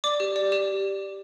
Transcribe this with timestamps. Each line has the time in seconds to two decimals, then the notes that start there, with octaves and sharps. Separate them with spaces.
0.04 D5 D6
0.20 G4
0.36 D5
0.52 G4